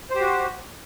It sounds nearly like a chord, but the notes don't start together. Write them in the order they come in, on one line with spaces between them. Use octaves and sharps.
C5 G4 F#4